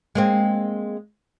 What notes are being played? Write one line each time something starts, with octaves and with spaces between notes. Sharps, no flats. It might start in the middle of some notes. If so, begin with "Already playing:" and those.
G#3 A#3 C4